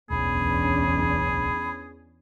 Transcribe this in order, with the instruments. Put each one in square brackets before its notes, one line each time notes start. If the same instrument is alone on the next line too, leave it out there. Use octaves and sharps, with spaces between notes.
[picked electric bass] D1 B1 [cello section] E2 C#4 D4 [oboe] G#4 [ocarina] B5